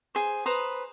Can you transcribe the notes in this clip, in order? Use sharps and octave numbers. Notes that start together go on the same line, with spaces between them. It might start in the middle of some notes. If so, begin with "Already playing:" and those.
G#4 C5
B4 C5 A#5 D#6